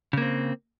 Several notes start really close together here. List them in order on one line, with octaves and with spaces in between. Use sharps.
C#3 A#3 C4